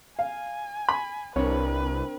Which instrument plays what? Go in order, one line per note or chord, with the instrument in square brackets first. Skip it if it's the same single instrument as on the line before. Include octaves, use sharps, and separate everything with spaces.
[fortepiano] F5 [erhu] G#5
[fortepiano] B5
[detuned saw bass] C2 [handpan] C4 D4 A#4 [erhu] B4 [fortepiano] C#5